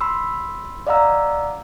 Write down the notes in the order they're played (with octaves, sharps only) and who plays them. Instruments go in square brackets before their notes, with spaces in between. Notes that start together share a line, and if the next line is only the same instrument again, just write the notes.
[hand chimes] B5 C6 E6
D5 D#5 F5 F#5 A#5 E6